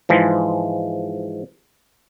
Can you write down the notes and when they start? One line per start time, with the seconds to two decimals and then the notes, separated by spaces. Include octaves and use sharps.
0.09 G#2 E3 F3 G#3